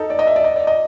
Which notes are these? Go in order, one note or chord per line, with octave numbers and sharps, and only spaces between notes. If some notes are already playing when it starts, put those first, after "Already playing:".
Already playing: D#4 A4
D5
D#5
E5
D5
D#5
D5
D#5